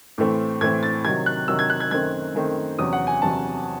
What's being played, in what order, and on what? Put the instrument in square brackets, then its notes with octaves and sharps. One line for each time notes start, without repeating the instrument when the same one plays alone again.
[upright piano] A2 E3 A3 C4
A2 E3 A3 C4 G#6
A6
C3 D#3 F#3 G#6
F#6
C3 D#3 F#3 E6
G#6
F#6
G#6
F#2 D#3 A3 C4 G#6
F#2 D#3 A3 C4
E2 C3 F#3 C#4 D#6
F#5
G#5
E2 C3 F#3 C#4 A5